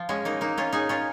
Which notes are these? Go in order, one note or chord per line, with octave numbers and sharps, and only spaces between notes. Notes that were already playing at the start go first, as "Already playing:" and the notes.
Already playing: F3
G#3 C#4
A#3 D#4
A#3 D#4
C#4 F4
D#4 G#4
C#4 F4